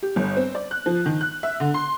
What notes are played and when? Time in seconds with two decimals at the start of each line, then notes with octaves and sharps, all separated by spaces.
0.03 G4
0.16 G1
0.37 C4
0.55 D5
0.71 F#6
0.86 F3
1.06 D#3
1.21 F#6
1.43 E5
1.60 D3
1.74 C6